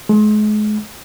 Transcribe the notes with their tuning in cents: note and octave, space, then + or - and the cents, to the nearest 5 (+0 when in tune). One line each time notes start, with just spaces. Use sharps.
G#3 +35